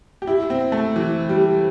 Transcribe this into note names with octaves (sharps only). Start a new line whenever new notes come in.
G4
E4
C4
A3
E3
G3